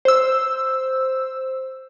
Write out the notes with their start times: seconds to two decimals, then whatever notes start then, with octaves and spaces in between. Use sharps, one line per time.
0.05 C5 E6